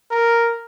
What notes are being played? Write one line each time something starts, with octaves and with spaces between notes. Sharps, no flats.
A#4